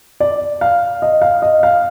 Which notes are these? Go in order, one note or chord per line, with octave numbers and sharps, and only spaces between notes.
D5
F5
D#5
F5
D#5
F5